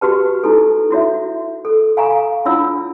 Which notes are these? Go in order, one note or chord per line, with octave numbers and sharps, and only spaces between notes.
F#4 G4 B4 A5
D#4 E4 F#4 A4
E4 F#4 C#5 E5
A4
F5 G#5 A#5 C#6
D4 E4 F4 C#5 F#5 E6